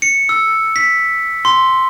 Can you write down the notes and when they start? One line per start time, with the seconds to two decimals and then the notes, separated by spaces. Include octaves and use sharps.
0.02 C#7
0.29 E6
0.76 B6
1.45 C6